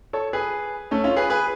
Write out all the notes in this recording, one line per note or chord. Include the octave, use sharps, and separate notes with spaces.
A4 C#5
G#4 B4
A3 C#4
C#4 F4
G#4 B4
G#4 B4